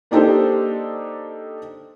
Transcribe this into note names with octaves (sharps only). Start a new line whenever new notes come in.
A#3 D4 D#4 G4 A4 C5